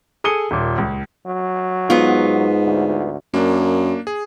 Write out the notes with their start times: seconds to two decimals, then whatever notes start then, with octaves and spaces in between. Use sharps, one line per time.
0.24 G#4 A4 D#6 C#7 D#7 G7
0.51 D#1 A#2
0.78 C#2
1.26 F#3
1.90 G#2 B3 F4
2.66 D2
3.34 F#2 A#3 D4
4.07 G#4